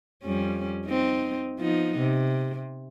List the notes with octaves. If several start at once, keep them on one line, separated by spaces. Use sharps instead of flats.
F2 G3 C#4
C4 D#4
F3 B3 D#4
C3